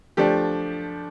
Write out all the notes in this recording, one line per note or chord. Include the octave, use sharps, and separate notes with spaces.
F3 A3 D4 G4